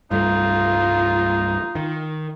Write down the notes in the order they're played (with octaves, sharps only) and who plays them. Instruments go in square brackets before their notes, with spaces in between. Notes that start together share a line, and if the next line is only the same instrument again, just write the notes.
[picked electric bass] C2 G2 A3 [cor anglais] D#4 [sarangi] F4
[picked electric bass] D#3